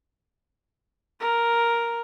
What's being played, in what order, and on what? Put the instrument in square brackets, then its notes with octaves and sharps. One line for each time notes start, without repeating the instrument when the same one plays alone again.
[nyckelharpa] A#4